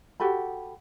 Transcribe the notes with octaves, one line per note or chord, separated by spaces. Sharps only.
F#4 G4 A4 B5